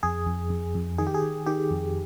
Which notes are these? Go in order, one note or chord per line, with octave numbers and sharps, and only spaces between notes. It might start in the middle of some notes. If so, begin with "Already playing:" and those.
F2 G#4
F2
F2
F2
D#3 G#4
G4
G#4
D#3
D#3 G4
F2